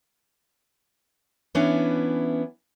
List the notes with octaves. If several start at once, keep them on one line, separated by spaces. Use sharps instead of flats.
E3 B3 C#4 D4 E4